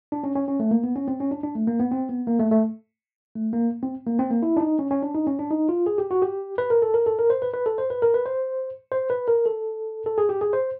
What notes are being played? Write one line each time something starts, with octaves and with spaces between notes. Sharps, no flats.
D4
C#4
C#4
C#4
A3
A#3
B3
C#4
C4
C#4
D4
D4
A3
A#3
B3
C4
B3
A#3
A3
A3
A3
A#3
C4
A#3
C4
A#3
E4
D4
D#4
C#4
C#4
D4
D#4
C#4
D4
D#4
F4
G#4
G4
F#4
G4
B4
A#4
A4
A#4
A4
A#4
C5
B4
B4
A4
C5
B4
A#4
B4
C5
C5
B4
A#4
A4
A4
G#4
G4
G#4
C5